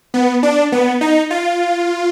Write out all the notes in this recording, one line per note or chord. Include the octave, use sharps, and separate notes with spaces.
B3
D4
B3
D#4
F4